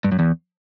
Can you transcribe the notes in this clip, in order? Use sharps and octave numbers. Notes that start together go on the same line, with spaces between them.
G2
F#2
E2